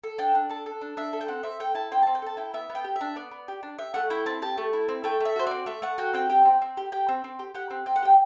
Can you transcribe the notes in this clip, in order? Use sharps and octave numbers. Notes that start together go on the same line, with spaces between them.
A4
D4 G5
D4
A4 A5
A4
D4
D4 E5
A4
G5
C4 F#5
C4 E5
A4 G5
E4 A5
C4 G5
C4 A5
G5
A4 A5
E4 G5
B3 E5
B3
G5
G4
E5
D4
B3 D5
B3
G4
D4
G4 E5
A3 F#5
E4 G5
C4 A5
G4 A5
A3
E4
C4
A3 G5
A3 E5
F#4 C5
C4 D5
A3 E5
A3 F#5
F#4 G5
C4 G5
G4 G5
C4
C4
G4
G4 G5
C4
C4
G4
G4 F#5
C4
C4 G5
F#5
G4 G5